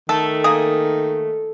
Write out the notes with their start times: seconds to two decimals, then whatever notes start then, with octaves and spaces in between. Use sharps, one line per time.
0.09 D#3 A3 A4
0.44 A#3 G#4